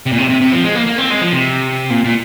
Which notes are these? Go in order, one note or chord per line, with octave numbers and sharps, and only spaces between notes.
C3
A#2
C3
C3
C3
F3
G#3
A#3
A#3
C4
G#3
F3
C3
A#2
A#2